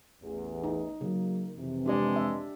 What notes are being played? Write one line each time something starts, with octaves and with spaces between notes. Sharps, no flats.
A1 E2
D#4
C#3 F#3 A#3
F2 C3 E3
G#3 D4 G4 D5
E5